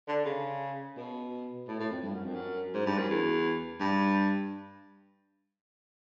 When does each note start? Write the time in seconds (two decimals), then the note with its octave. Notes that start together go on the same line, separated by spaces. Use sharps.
0.08 D3
0.25 C#3
0.97 B2
1.68 A2
1.79 A2
1.91 F2
2.03 G2
2.14 F#2
2.24 F2
2.34 F#2
2.74 G#2
2.86 G2
2.98 F#2
3.10 E2
3.80 G2